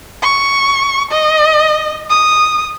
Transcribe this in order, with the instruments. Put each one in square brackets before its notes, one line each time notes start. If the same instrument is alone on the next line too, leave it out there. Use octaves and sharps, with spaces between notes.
[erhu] C#6
D#5
D#6